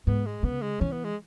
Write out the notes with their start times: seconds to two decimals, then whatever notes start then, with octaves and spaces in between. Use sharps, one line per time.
0.07 G#2 B3
0.26 G#3
0.43 C#3 B3
0.62 G#3
0.80 E3 C#4
0.92 B3
1.04 G#3